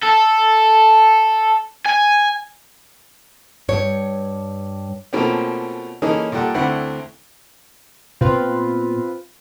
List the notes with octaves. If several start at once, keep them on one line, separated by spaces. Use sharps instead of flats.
A4
G#5
G2 C#5
B2 F3 A3 A#3 C4 C#4
E3 A#3 C#4 D#4 G#4 A4
A#2 G3 A4 F#5
D2 D3 C4 E4 F#5 B5
A#2 B3 C4 F4 B4